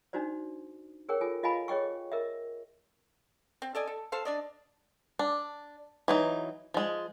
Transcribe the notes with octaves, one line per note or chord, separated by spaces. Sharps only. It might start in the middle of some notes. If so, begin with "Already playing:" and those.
D4 D#4 F#4 C5 D5
G#4 A#4 C#5 G5
F4 A4 G#5
F4 D#5 F5 G#5 B5
G#4 C#5 D#5 G5 C#6
A#4 D#5 E5
C4
A4 D5 D#5 G#5
A4
A4 C5 F5
D4 D5 D#5
D4
E3 F#3 D#4
F3 G#3